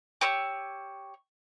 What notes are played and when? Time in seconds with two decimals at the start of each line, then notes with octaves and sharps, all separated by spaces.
0.21 G4 C#5 E6